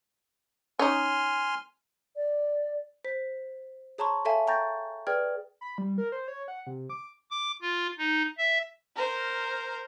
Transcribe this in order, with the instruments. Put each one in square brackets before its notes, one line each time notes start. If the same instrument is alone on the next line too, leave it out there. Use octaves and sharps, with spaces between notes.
[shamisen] C#4 D#4 [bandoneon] G#5 C6 F6
[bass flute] D5
[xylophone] C5 B6
G#4 C#5 A5 A#5 C6 C#6
A4 C#5 E5 F5 G#5 A5
G5 A#5 C#6 G6 A6 A#6
G#4 B4 D5 G5 F6 G#6
[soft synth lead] B5
G3
A#4
C5
C#5
F#5
C3
D6
[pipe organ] D6
F4
D#4
E5
[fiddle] A#4 C5